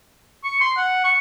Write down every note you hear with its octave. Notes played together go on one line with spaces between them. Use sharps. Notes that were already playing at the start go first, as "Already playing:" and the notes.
C#6
C6
F#5
C#6